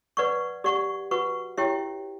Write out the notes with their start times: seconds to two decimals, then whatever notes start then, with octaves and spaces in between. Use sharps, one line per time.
0.17 B4 D5 F#5 C#6
0.64 G4 D5 F#5 C#6
1.11 F#4 B4 F#5 C#6
1.58 E4 G4 C#5 E5 G5